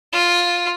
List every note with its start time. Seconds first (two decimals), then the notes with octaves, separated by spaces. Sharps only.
0.13 F4